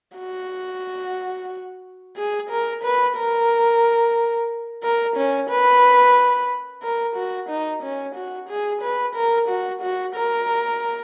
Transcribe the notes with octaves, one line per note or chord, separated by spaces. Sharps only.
F#4
G#4
A#4
B4
A#4
A#4
C#4
B4
A#4
F#4
D#4
C#4
F#4
G#4
B4
A#4
F#4
F#4
A#4